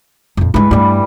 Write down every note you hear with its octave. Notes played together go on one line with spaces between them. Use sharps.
F2 A#2
G2 E3 G#3 B4
G2 G3 A3